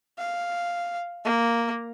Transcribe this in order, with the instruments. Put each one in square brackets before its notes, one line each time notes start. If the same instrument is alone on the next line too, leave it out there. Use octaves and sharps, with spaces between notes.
[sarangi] F5
A#3